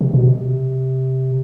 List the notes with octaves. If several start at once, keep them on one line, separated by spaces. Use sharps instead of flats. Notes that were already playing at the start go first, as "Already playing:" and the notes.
C3
B2
C3